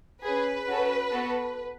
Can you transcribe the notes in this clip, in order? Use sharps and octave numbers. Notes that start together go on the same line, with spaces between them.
C#4 G#4 B4
C#4 F#4 A4
B3 F#4 A4